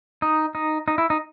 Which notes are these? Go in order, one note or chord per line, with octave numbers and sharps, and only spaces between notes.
D#4
D#4
D#4
E4
D#4